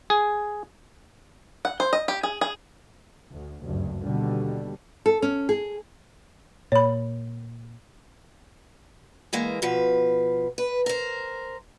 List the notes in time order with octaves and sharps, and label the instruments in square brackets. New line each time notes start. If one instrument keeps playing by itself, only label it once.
[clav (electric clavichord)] G#4
[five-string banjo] F#5
C5
D#5
G4
G#4
G#4
[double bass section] D2
F#1 D2 G2
D#2 B2 D3 G3
[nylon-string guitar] A4
C#4
G#4
[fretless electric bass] A#2 [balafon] C#5 B5
[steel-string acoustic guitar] E3 G#3 A#3
B2 F3 B4
B4
A#4 C5